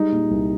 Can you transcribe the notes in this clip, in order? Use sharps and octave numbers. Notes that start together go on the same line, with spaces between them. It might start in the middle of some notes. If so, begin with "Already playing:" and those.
Already playing: G3 G#3 D#4
A#2
C2